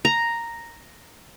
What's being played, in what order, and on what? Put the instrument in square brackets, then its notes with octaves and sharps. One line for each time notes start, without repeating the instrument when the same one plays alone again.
[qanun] A#5